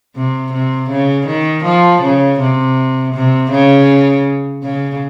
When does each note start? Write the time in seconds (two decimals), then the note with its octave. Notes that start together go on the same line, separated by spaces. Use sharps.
0.15 C3
0.52 C3
0.90 C#3
1.26 D#3
1.64 F3
2.02 C#3
2.40 C3
3.14 C3
3.51 C#3
4.63 C#3